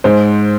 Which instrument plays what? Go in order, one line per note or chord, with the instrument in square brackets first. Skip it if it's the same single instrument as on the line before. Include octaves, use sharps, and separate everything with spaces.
[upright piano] G#2 C5